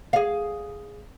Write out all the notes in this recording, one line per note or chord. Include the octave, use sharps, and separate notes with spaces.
G#4 F5